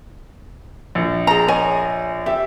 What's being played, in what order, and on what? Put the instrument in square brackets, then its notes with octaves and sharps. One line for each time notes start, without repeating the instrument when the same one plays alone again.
[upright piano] A#1
[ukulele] G#4 A#5
C#5 D#5 G#5
[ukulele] G4 [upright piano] E5